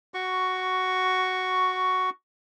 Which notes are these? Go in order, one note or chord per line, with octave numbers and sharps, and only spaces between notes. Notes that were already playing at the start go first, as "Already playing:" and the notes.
F#4 C#6